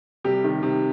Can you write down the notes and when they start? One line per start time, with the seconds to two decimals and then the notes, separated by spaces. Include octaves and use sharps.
0.24 C3 G3 G4
0.44 D#3
0.63 C3